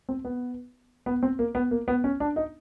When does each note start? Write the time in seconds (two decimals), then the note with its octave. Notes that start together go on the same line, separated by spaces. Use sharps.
0.09 C4
0.25 B3
1.06 B3
1.23 C4
1.39 A#3
1.55 B3
1.71 A#3
1.88 B3
2.04 C#4
2.20 D4
2.36 D#4